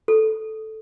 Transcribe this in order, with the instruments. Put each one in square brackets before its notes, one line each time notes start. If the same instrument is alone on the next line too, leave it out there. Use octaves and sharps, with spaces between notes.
[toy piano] A4